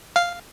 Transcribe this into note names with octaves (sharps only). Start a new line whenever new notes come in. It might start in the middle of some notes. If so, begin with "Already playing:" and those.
F5